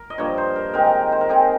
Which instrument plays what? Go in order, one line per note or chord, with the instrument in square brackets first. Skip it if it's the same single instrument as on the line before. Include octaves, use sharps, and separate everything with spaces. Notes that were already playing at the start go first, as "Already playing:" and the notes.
Already playing: [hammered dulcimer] A#4
D#5
G2 F3 A#3 C#5
C5
A#4
D#3 G#3 C4 D#4 A#4
C5
A#4
D#3 G#3 C4 D#4 G#4